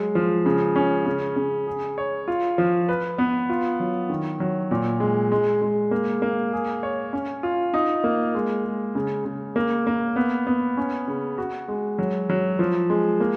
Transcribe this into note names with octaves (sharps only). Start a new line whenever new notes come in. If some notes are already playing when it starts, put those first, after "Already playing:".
Already playing: F#3 G#3
F3
C#3
C#4
C#3
C#3
G#4
C#5
F4
F3
B4
B3
F4
F#3
D#3
F#3
A#2
G#3
G#3
G#3
A#3
A#3
G#4
C#5
C#4
F4
D#4
A#3
G#3
G#3
C#3
C#3
A#3
A#3
B3
B3
C#4
C#3
F#4
G#3
F#3
F#3
F3
G#3
A#3